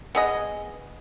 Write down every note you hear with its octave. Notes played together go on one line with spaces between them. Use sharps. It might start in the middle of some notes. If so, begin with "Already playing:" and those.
B3 G#4 D#5